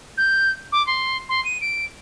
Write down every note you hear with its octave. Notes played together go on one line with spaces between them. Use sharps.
G6
D6
C6
C6
D#7
D7